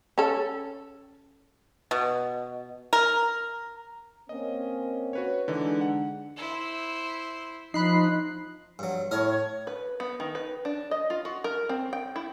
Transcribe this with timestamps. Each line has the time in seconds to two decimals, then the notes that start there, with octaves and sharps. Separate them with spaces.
0.18 C#4 A4
1.91 B2
2.93 A#4
4.29 A#3 C4 C#4 D#5
5.13 F#4 B4 C#5
5.48 D3 E3 G#3 D4 D#4
5.81 F#5
6.37 E4 C5
7.74 F3 D#4 B5 F#6 C7
8.79 G2 F#3
9.11 A2 A#4 C#5 D#5
9.67 B4
10.00 B3
10.20 D#3
10.35 B4
10.65 D4
10.91 D#5
11.10 F4
11.25 F#4
11.44 A#4
11.69 C4
11.93 G5
12.16 E4